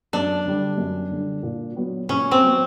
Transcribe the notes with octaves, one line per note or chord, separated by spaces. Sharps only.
F#2 D4
D3 G3
F#2
D3 G3
A#2
F#3 B3
A#2 C#4
C4
F#3 B3